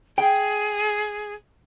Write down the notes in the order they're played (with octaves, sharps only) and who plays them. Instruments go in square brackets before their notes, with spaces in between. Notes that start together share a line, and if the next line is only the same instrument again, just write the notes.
[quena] G#4 [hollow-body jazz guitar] G5